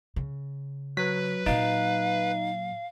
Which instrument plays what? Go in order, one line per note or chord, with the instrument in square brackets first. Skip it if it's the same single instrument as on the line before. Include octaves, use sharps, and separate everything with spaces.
[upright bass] C#3
[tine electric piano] F#3 B6 [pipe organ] B4
[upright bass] A#2 F#3 [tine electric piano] D#4 [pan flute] F5